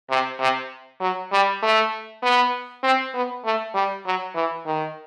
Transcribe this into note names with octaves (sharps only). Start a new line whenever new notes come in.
C3
C3
F#3
G3
A3
B3
C4
B3
A3
G3
F#3
E3
D#3